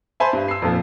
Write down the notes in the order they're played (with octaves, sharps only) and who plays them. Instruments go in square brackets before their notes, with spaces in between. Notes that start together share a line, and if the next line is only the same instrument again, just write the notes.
[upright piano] C5 E5 G#5 A5 B5 C6
G2
E6 C7
F2 A#2 F3